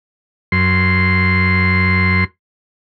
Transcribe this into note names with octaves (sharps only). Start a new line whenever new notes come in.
F#2 C6